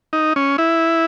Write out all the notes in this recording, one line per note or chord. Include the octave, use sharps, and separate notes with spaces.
D#4
C#4
E4